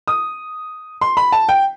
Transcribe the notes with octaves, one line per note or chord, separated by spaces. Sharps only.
D#6
C6
B5
A5
G5